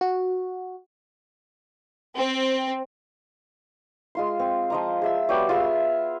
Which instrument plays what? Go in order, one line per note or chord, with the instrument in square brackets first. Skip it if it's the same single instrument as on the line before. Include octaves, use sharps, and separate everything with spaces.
[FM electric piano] F#4
[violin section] C4
[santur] G#3 F4 C6
C4
F3 D#5 A#5
G#4 E5 E6
F#3 G3 B3 G4
F4 G#4 E5 E6